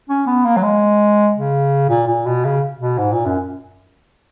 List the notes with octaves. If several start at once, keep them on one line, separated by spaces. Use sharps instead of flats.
C#4
B3
A#3
F#3
G#3
C#3
A#2
A#2
B2
C#3
B2
G#2
A#2
F#2